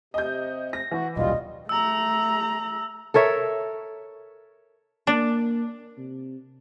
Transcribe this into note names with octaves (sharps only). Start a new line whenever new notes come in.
C3 D#5 G6
A#6
E3 F#4
D#1 B1 G3 F4 D#5
A3 A#5 E6
A4 A#4 C#5 E5
A#3 D4
C3